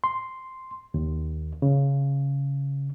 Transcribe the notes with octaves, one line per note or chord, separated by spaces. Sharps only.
C6
D#2
C#3